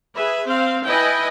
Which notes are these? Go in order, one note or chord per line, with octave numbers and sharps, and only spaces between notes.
G#4 B4 E5
C4 C5 F5
E4 B4 D#5 G5 G#5